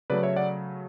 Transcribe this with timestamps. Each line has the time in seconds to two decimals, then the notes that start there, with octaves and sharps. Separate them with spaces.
0.10 C#3 F#3 A3 B4 D5
0.23 C#5 E5
0.36 D5 F#5